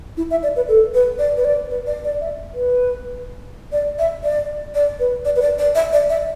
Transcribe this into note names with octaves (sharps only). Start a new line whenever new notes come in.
E4
E5
D5
B4
A4
B4
D5
B4
D5
B4
D5
D5
E5
B4
D5
E5
D5
D5
B4
D5
B4
D5
D5
E5
D5
E5